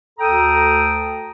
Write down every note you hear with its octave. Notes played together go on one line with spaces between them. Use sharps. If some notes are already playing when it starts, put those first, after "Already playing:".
D2 A4 G5 A#5 D#6